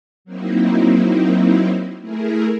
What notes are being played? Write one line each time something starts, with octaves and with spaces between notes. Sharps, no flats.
F#3 A#3 C4 D#4 E4
A3 E4 G#4 A#4